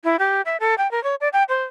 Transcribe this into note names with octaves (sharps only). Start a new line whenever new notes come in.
E4
G4
E5
A4
G5
A#4
C#5
D5
G5
C5